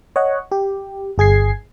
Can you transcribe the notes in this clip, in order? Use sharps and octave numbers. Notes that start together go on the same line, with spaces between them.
C#5 D#5 F#5
G4
G1 G#4 G#6 C7